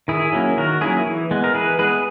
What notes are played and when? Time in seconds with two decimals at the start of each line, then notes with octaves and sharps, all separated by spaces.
0.08 D#3 E4 G#4
0.33 F#3 A#3 C#4
0.57 D#3 F#4 A#4
0.81 F#3 A#3 C#4 E4 G#4
1.06 E3
1.31 G#3 B3
1.44 A#4
1.54 E3 G#4 B4
1.79 G#3 B3 G#4 B4